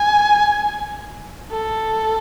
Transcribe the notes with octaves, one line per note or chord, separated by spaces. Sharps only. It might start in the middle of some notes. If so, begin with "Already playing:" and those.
Already playing: G#5
A4